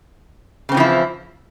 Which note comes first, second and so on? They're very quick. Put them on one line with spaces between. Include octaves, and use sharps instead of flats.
C#3 C4 E3 F3 E4